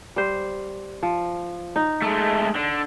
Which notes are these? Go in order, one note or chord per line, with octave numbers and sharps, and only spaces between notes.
G3 C5
F3
D#4
G#3 A3
D3